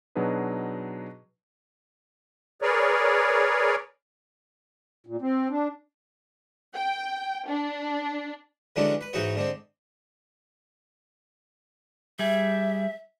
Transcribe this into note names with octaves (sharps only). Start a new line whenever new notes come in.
B2 F#3 D4 D#4 G#4 B4
G#4 A#4 B4 C#5 D5
A#2
C4
D4
G5
D4
D3 E3 F#3 G#3 C#4 D4
B4
G#2 E3 D#4 F#4 C#5
D3 G#3 C4
G3 G#4 E5